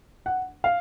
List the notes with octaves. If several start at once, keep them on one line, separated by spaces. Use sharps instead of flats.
F#5
F5